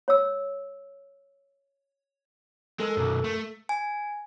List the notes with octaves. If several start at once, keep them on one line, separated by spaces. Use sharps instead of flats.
C#5 E6
G#3 A4 A#4 E6
B1 F#2
A3
G#5